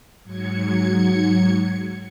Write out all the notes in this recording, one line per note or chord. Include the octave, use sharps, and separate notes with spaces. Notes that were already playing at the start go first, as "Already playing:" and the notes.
G#2 F#3 G#6 C#7